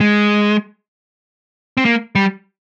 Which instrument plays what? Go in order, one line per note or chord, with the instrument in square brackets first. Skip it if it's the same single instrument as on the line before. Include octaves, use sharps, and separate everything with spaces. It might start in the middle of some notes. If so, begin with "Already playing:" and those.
[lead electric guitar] G#3
C4
A#3
G3